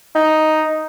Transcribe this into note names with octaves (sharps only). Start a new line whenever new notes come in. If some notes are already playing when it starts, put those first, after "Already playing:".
D#4